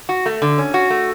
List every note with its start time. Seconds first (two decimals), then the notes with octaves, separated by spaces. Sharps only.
0.09 F#4
0.26 A3
0.42 D3
0.58 C#4
0.74 F#4
0.90 A3